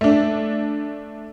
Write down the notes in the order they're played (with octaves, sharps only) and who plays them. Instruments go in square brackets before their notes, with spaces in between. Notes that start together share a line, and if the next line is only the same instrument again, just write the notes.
[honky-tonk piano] A3 D4